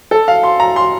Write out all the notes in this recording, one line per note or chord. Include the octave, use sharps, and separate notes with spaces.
A4
F5
C6
A#5
C6